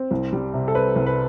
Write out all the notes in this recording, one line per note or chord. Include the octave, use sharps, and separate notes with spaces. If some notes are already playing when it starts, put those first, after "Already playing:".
Already playing: C4
C2
G3
C3
A4
C4 B4
C2
B4